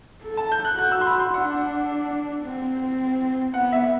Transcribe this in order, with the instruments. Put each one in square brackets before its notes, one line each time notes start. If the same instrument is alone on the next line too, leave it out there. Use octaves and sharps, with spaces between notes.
[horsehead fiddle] A4
[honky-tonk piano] A5
G6
F#6
[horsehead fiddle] F#4 [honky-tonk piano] F#6
[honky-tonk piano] E6
C6
B5
C6
[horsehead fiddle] D4 [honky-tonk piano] F#5
[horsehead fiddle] C4
[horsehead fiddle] B3 [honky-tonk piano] F#5
[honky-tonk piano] E5